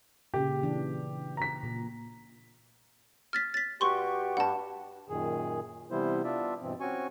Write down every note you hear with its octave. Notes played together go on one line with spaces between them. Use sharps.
A#2 C#3 G4
E3 D4
A#5 B6
A#2
F6 A6 B6
A6 B6
G2 F#4 G4 C6 C#6
G2 F#5 A5
F#2 A#2 D#3 G#4
C3 E3 G3 B3 E4 C5
B3 D4 F4 D5 E5
G2 B2 E3 C4
C4 C#4 F#4 G#5 C#6